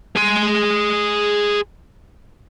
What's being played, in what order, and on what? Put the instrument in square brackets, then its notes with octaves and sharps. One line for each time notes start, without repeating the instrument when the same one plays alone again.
[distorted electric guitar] G#4 C6